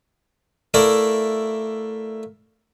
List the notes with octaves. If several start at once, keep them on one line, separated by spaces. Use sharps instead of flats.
A3 E4 A#4 D5 F5